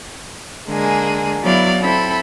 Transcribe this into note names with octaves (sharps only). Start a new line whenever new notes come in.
D3 G#3 A#3 G#4
F#3 B3 E4 D5 F5
C4 E4 A4 B5